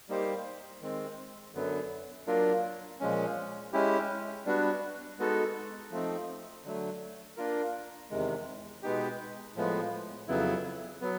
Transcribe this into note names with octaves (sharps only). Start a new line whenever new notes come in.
G3 A#3 D#4 G4 C5
D#3 G#3 C4
F#2 D3 F#3 B3
F#3 A#3 D4 F4 A#4
A#2 F3 G#3 C#4
G#3 C#4 E4 G4
G3 B3 D4 F#4
G#3 B3 D#4 F#4 A4
F3 A3 C4 D#4
D3 F#3 A3
A#3 D4 F4 A#4
E2 C3 D#3 G#3
B2 G#3 B3 D#4 G4
A2 F3 G#3 B3
F2 C#3 F#3 B3 E4
F#3 B3